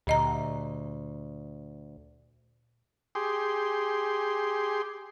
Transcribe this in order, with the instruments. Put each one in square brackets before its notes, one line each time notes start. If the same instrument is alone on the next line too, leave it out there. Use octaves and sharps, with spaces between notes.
[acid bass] D2 [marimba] A#2 D#5 A#5
[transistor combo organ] G4 G#4 C6